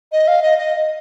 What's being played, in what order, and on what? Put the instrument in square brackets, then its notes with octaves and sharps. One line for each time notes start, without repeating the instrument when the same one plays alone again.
[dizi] D#5
F5
D#5
D#5